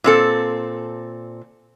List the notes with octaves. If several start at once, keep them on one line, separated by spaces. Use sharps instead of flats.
A#2 C4 A4